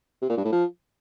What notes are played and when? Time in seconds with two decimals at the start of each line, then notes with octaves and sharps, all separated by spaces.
0.22 C3
0.30 A#2
0.37 G2
0.45 A2
0.52 F3